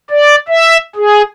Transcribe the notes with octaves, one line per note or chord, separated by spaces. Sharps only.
D5
E5
G#4